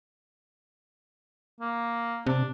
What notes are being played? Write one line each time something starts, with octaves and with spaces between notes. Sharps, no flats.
A#3
C3 D4